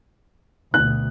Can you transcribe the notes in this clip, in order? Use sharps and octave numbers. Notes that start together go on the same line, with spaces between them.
D2 B2 F#6